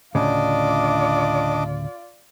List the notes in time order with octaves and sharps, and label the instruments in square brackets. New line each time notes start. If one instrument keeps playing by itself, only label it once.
[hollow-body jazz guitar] D2 A2 C#3 [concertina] D4 D#5 D6 [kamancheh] F4 D5